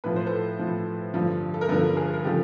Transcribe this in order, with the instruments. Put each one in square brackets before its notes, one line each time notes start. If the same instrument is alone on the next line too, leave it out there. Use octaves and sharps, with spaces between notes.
[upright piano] A2 F3 B4
C5
A4 B4
A2 F3
G2 D3 F3
A4
A#4
G2 D3 F3 A4 B4
G#4 A#4
A#4
C#3 F3 G4 A4